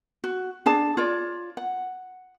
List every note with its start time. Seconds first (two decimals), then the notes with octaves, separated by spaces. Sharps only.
0.24 F#4
0.66 D4 G#4 A5
0.97 F4 C#5 D5
1.57 F#5